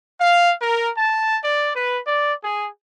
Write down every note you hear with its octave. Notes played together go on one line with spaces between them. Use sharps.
F5
A#4
A5
D5
B4
D5
G#4